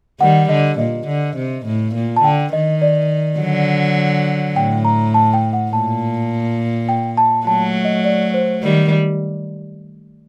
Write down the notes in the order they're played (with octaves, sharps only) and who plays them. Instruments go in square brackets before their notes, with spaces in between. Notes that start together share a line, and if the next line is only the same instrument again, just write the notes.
[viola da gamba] D#3 G3 [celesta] F#5
[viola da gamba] D3 [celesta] D#5
[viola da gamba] A#2 [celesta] D#5
[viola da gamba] D3
C3
A2
A#2
[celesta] A5
[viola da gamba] D3 [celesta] G5
[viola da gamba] D#3 [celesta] D#5
[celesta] D5
[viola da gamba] D3 F#3
[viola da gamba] A2 [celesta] G5
[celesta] A#5
A5
G5
F#5
[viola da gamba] A#2 [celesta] A5
[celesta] G5
A5
[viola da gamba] F#3 A3 [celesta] A5
[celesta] D#5
D5
C5
[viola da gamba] D#3 G3